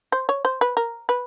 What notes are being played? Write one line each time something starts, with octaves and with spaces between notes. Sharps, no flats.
C5
C#5
C5
B4
A#4
B4